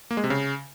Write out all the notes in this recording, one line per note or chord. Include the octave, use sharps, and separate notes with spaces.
A#3
G#3
C3
C#3